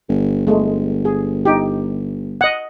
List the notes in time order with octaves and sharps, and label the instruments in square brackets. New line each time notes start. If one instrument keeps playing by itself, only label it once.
[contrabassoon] G1
[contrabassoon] G1 [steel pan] G#3 A3
[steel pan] G#4
D#4 G4
D#5 F#5